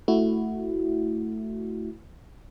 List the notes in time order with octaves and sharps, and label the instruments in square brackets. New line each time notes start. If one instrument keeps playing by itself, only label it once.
[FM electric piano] A3 E4 F#4